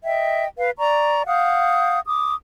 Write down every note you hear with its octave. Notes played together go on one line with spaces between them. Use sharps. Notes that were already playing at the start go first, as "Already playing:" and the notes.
D#5 E5 G5
B4 F5
D5 A#5 C#6
F5 F#5 D#6 G6
D6 D#6